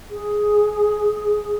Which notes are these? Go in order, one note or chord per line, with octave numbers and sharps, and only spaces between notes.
G#4